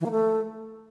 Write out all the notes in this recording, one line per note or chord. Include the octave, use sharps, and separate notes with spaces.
E3
A#3
A3